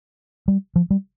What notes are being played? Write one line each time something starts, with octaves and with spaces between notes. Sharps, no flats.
G3
F3
G3